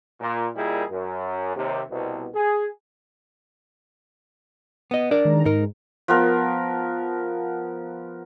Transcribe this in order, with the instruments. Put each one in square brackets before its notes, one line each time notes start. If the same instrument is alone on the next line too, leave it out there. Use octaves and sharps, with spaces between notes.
[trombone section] A#2
A#2 D#3 G3 D#4 E4 G#4
F#2
D#2 C3
C2 B2
G#4
[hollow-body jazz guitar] B3 D#5
D4 A#4 D5
[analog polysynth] D#3 G#3 A#5
[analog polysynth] G#2 [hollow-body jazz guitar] D#4 A#4
[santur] F3 B3 A#4